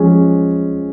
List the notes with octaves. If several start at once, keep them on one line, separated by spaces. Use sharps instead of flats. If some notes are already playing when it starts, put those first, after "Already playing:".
Already playing: F3 G#3 C#4